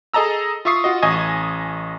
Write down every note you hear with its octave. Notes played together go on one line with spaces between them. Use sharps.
G#4 A4 D#5 A5 A#5 E6
F4 E5 C#6 D#6 C7
F4 F#4 D#5
A1 D#5 G#5 C#6 G#6